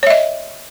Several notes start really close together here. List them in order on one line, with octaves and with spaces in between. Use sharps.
C#5 E5 D#5